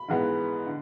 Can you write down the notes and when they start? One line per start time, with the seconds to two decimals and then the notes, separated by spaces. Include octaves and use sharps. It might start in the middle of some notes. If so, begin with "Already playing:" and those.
Already playing: B5
0.08 G#2 E3 G#3 B3
0.67 D3